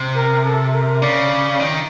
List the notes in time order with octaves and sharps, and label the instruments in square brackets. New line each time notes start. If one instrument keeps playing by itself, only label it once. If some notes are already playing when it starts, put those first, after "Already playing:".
Already playing: [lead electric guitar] C3
[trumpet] A#4
A4
A#4
[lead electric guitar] C#3 [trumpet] D5
[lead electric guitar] D#3